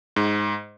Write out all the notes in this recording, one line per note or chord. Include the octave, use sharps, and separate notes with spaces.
G#2